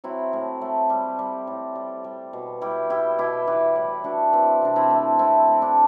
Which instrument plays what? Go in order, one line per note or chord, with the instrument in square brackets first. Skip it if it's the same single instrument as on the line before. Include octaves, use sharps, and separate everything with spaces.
[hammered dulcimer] F#3 C4 E4
A2
A3
G3
G3
A2
G3
G3
B2
G3 E4 G4
G3 E4 G4
B2 E4 G4
E3 G4 B4
A2 G4 B4
A3 D4 F#4
E3 C4 E4
C3 D4
C4 E4
A3
A3 C4 E4
A3
D4